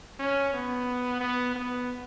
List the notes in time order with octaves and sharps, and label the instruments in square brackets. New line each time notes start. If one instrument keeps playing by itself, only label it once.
[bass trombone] C#4
B3
B3
B3